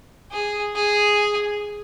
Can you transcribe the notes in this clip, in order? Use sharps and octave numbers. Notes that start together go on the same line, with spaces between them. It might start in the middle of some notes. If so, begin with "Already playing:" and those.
G#4
G#4